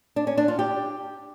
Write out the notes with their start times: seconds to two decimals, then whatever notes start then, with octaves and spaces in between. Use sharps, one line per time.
0.16 D4
0.27 C#4
0.38 D4
0.48 F4
0.59 G4